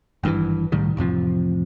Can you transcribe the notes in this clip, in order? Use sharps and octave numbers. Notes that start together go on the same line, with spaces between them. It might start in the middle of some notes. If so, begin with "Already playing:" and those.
G#1 G2 C#3 E3
C2 A2 D#3 G3
A1 F2 C3 F3